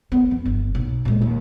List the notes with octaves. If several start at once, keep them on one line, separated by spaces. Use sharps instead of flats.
B3
F2
G1
B1
A#2 G#3
D#2